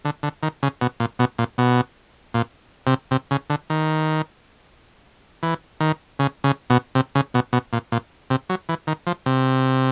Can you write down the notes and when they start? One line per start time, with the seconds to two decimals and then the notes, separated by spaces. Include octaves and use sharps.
0.05 D3
0.23 D3
0.43 D#3
0.63 C#3
0.81 B2
1.00 A#2
1.19 B2
1.39 A#2
1.58 B2
2.34 A#2
2.87 C3
3.11 C3
3.31 C#3
3.50 D3
3.70 D#3
5.43 E3
5.80 D#3
6.19 C#3
6.44 C#3
6.70 B2
6.95 C3
7.15 C#3
7.34 B2
7.53 B2
7.73 A#2
7.92 A#2
8.30 C3
8.50 F#3
8.69 E3
8.87 D#3
9.07 F3
9.26 C3